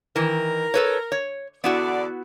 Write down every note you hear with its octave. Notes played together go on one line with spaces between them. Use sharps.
D#3 E3 A#4
A4 B4 C#5
C#5
E2 D3 B3 E4 F#4 D5